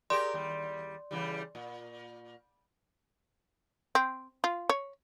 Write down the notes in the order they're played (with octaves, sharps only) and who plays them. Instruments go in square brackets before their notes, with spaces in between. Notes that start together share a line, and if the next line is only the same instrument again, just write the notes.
[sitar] G4 G#4 A#4 [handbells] D5 C6
[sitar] D#2 G3
C#3 E3 G3
A#2
[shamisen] C4
F4
C#5